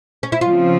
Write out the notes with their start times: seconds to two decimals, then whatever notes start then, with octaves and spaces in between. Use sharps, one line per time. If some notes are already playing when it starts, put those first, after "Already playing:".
0.23 C#4
0.32 E4
0.41 C#3 F3 C4 F4